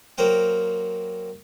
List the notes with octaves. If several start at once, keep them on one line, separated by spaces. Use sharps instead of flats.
F#3 A#3 A#4 C5 G5